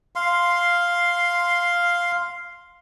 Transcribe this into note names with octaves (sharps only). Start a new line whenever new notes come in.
F5 C6